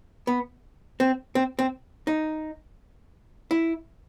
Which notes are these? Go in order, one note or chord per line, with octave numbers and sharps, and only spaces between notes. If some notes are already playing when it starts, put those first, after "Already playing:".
B3
C4
C4
C4
D#4
E4